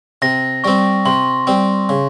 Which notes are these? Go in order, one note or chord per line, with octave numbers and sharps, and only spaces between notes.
C3 A#6
G3 C4 C#6
C3 C6
G3 C4
C#3